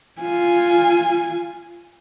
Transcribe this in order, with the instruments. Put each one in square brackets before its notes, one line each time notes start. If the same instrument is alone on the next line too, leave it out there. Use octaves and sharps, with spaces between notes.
[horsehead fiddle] F4 G#5